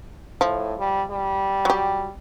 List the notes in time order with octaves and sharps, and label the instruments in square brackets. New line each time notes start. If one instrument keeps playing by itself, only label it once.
[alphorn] A2 [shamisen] F3
[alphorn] G3
G3
[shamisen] F#3 G4